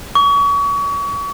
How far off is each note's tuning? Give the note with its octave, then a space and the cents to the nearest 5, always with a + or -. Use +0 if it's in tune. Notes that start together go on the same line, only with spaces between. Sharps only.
C#6 +35